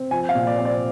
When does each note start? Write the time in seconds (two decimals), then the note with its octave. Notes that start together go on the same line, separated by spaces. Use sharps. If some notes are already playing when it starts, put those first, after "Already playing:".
Already playing: C4
0.11 F3 G#5
0.29 F5
0.35 A#2
0.47 D5
0.59 C4
0.65 D5